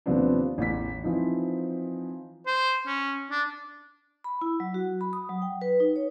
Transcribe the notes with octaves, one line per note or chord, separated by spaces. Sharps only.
D#2 C3 F3 B3 C4 D4
A1 E2 A2 B6
E3 F3 C4 D#4
C5
C#4
D4
B5
E4
F#3
F#4
B5
D#6
F#3
G5
B4
D#4
C#5